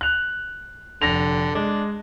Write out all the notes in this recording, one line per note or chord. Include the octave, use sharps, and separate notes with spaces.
F#6 F7
F1 D3 A#6 F7
G#3 D4